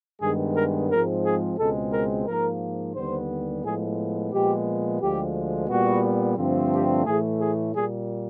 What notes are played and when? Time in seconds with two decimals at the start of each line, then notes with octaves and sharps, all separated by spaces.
0.22 G2 D#3 G#3 B3 G#4
0.56 A#4
0.90 G#2 F3 G#3 C4 A#4
1.24 G#4
1.58 C#2 B2 G#3 C4 A4
1.93 A#4
2.27 G#2 F3 A#3 A#4
2.95 D#2 D3 G3 B3 C5
3.64 A2 F3 G#3 B3 G#4
4.32 A#2 F3 G#3 B3 G4
5.00 D2 D3 F3 G#3 G4
5.69 A#2 G3 B3 F#4
6.37 G2 D3 F3 A3 C4
6.72 G4
7.06 A2 E3 A3 G#4
7.40 G#4
7.74 A#2 G3 A#3 G#4